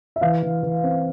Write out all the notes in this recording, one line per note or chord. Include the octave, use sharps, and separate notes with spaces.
E5
E3 F5
E3
E3
C4